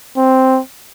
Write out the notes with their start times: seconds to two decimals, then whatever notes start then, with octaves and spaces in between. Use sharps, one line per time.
0.17 C4